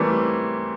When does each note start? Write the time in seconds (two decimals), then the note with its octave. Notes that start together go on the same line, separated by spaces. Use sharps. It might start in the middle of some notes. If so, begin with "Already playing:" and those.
Already playing: E3 G3 A3 A#3 C4